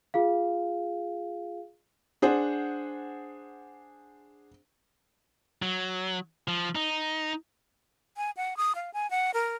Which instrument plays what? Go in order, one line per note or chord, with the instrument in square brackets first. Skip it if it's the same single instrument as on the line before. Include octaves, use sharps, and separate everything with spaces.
[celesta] F4 G#4 F5
[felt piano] D4 G#4 C5 F#5
[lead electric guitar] F#3
F3
D#4
[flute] G#5
F#5
D#6
F5
G#5
F#5
A#4